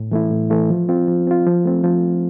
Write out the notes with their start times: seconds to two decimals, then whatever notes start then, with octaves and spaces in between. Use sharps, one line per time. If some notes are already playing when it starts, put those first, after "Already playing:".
Already playing: A2
0.11 E3 A3 E4
0.31 A2
0.50 E3 A3 E4
0.70 F3
0.89 C4 F4
1.08 F3
1.27 C4 F4
1.46 F3
1.65 A3 C4
1.84 F3